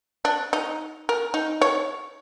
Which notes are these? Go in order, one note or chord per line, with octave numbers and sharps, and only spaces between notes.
D4
D#4
A#4
D#4
C#5